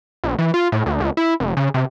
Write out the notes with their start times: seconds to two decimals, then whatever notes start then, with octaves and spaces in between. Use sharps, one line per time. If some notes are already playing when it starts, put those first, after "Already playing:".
0.24 A#1
0.39 E3
0.54 F4
0.72 A2
0.86 D2
1.00 C#2
1.17 E4
1.40 F1
1.57 C#3
1.74 C3